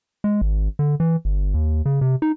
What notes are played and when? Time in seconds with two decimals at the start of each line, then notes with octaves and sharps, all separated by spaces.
0.24 G#3
0.41 G#1
0.79 D3
1.00 E3
1.25 G1
1.54 D#2
1.86 C#3
2.01 C3
2.22 D#4